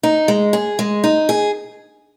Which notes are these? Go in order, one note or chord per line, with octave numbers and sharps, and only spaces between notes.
D#4
G#3
G#4
G#3
D#4
G#4